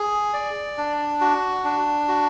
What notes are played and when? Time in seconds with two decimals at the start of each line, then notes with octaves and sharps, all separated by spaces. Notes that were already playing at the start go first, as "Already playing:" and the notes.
Already playing: G#4
0.33 D5
0.78 D4
1.21 F#4
1.64 D4
2.08 F#4